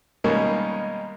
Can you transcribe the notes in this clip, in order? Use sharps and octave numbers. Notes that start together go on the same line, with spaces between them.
B2 D#3 G3 G#3 A#3 C#4